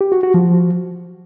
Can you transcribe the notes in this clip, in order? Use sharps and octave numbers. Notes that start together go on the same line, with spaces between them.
G4
F#4
F#4
F3